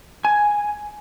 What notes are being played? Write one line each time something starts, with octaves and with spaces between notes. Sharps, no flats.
G#5